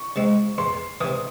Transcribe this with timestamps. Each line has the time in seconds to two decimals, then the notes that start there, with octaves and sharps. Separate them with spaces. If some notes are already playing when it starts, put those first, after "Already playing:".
Already playing: C#6
0.16 C#3 G#3 C4
0.58 E2 C6
1.01 C3 E3 D#6